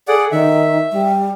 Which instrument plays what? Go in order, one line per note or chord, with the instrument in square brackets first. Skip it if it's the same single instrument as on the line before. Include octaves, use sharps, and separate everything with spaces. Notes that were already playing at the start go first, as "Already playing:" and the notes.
[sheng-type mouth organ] G#4 D5 F#5 [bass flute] A4
[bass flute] D#3 [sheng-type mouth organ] E5
[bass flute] G3